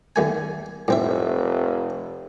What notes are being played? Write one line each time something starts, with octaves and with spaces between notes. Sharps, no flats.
D#2 A3 G#5
F1 A2 C4 E5